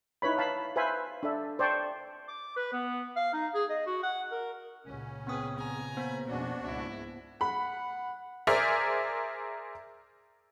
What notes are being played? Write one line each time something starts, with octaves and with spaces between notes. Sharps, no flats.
D#4 E4 B4 C#5 B5
F5 A5 B5
B4 C5 E5 F5 G#5 B5
D4 A4 E5
C5 D5 G5 A5 C#6
D6
B4
B3
F5
D#4
G#4
D#5
F#4
F#5
A#4
C#2 A#2 C#3 C#4
B3 C4 G#4 B4 D#6
G#5 A#5
A#3 B3 C5 B5
F2 B2 G#3 C#4 D4 F#4
C#2 G#2 E4
F#5 B5
G#4 A#4 C5 D5 E5